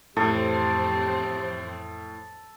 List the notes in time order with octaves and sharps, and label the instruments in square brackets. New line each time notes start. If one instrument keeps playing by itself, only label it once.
[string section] F2 E3 C4 [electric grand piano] A2 [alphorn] G4 [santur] A4